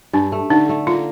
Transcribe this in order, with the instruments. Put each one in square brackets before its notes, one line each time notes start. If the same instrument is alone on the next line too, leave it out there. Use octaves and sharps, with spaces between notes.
[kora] G2 [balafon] D4
[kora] A3
[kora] D3 [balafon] D#4
[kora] A3
[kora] A#3 [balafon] F4